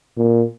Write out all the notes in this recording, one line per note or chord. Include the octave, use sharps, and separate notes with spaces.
A#2